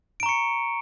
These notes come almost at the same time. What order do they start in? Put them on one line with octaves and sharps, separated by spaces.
D7 A#5 C#6 C#7